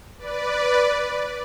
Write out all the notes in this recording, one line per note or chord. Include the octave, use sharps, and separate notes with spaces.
B4 D5